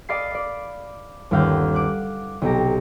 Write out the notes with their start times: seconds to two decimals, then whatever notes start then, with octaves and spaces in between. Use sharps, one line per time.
0.09 D5 D#5 F5 B5 A6 C7
0.34 D5
1.31 G1 D#2 C#4 F5 F#5 G6
1.75 D6 F#6
2.42 B1 C3 G4 A#6